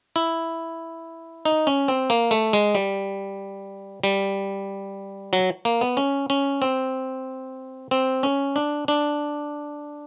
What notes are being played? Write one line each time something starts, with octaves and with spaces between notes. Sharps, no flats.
E4
D#4
C#4
C4
A#3
A3
G#3
G3
G3
F#3
A#3
B3
C#4
C#4
C4
C4
C#4
D4
D4